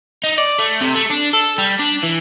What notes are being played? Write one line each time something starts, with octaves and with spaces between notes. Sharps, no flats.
D#4
D5
A3
C3
A3
D4
A4
G3
D4
E3